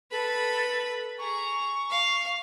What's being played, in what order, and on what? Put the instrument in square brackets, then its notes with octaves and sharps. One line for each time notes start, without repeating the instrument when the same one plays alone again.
[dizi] A4 [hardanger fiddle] B4 B5
[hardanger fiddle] G#4 A#5 [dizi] C#6
[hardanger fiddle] F5